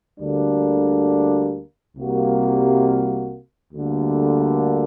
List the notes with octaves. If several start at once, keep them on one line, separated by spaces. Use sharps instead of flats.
D2 D3 G3 A#3 D4
C2 C3 G3 A#3 F#4
D2 D3 G3 A#3